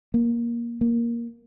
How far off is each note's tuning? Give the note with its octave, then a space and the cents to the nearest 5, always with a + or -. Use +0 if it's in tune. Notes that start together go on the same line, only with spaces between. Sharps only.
A#3 +15
A#3 +10